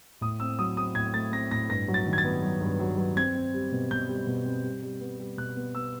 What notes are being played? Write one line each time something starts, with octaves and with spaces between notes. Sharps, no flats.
A2 D#6
C4 E6
F#3 D#6
C4 D#6
A2 G#6
A3 A6
C4 A#6
A2 A#6
G2 A#6
F#3
A6
D#3
G#6
A6
B3
F#3
G2
F#3
F#3
C4 G#6
C4
G3
B2
B2 G6
G3
B2
C4
G3
G3
B3
G3
B2 F#6
B3
B3 E6